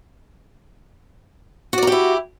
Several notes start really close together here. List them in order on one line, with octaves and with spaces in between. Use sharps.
F#4 D5 A#4 G4 E4